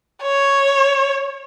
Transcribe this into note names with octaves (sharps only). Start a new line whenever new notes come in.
C#5